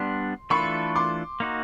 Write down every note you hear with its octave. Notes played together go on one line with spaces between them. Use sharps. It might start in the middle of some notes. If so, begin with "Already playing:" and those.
Already playing: G3 B3 D4 C6
E3 A3 D4 F4 A4 B5 C#6
C6 D6
A#3 D#4 F#4